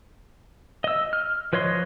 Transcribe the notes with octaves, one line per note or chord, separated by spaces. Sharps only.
D#5 E6
F6
F3 B4 C#5 D#5 C6